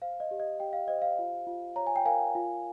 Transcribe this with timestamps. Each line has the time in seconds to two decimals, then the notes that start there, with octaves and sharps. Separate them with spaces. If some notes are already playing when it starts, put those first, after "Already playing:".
0.02 C5 F5
0.20 D#5
0.31 G4
0.40 D#5
0.60 G4 G5
0.73 F5
0.88 C5 D#5
1.02 F5
1.19 F4
1.47 F4
1.76 C#5 A#5
1.87 G#5
1.96 G5
2.05 A#4 F5 G#5
2.35 F4